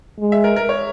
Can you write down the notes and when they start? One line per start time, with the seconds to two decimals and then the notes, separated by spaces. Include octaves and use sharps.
0.20 G#3
0.32 E5
0.44 A#4
0.56 A#4
0.69 C#5